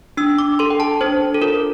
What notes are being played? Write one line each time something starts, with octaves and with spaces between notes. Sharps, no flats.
D4 E6
D6
A4 C6
G5
A5
D4 C5
A4
F4 A#4